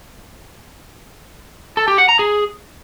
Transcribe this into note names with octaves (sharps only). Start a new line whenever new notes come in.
A4
G4
F#5
A#5
G#4